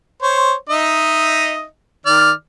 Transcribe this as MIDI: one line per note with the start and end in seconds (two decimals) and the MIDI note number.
0.22 0.54 72
0.22 0.54 73
0.69 1.64 63
0.69 1.64 75
0.69 1.64 76
2.06 2.31 51
2.06 2.31 74
2.06 2.31 89